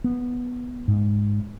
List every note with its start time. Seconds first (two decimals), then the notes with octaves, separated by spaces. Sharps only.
0.04 B3
0.88 G#2